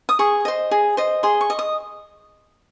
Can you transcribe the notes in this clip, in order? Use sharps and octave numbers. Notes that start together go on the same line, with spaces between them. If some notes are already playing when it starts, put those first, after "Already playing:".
D#6
G#4 C#6
C5 D#5
G#4
C5 D#5
G#4 C6
C#6
D#5
D#6